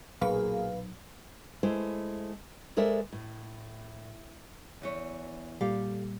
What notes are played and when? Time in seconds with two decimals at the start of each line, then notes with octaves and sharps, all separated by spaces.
0.21 B1 A#2 F#3 A#3 B3 G#4 B4 F5
1.63 G#3 A3 E4 C5
2.77 G#3 A4 A#4 C5 D5 E5
3.13 A2
4.82 E2 E3 C#5
5.61 A#2 G3 G4 A4 F5